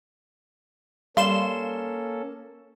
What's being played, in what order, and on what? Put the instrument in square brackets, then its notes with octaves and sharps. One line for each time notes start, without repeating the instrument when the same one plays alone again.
[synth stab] G3 C6 E7 [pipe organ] A#3 C#4 A4 [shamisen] F5